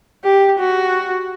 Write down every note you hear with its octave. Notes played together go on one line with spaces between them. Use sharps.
G4
F#4